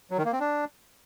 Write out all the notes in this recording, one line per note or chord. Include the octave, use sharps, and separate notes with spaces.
F#3
D#3
A#3
C4
D4